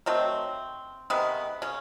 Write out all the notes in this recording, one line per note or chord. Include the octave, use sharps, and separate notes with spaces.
D#3 F#3 A3 C4
C3 D#3 G#3 B3
C#3 C#4